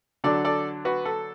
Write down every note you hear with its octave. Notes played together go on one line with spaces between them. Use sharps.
D3 F#3 D4 A4 D5
A4 D5
F#4 B4
A4